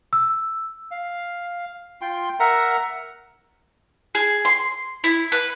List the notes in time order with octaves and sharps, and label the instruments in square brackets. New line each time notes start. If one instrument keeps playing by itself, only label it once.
[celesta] E6
[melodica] F5
F4 G5 C6
A#4 E5 F#5 A#5
[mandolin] G#4
C6
E4
B4